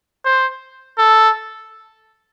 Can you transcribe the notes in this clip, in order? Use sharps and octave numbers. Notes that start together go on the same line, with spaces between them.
C5
A4